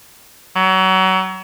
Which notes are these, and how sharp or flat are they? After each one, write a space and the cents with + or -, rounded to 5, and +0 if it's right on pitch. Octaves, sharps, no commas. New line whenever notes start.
F#3 +30